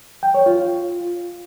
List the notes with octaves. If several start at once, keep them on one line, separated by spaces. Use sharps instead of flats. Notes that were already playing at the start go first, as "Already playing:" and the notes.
G5
C#5
F4